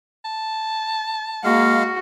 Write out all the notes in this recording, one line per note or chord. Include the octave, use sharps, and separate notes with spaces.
A5
G#3 A#3 F#4 F5